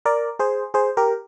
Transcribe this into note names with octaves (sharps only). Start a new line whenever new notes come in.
A#4 D5
G#4 C5
G#4 C5
G4 A#4